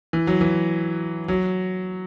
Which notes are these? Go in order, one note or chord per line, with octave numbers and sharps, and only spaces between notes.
E3
F#3
E3
F#3